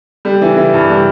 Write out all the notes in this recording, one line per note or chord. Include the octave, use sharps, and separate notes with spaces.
G3
E3
E3
G2
G3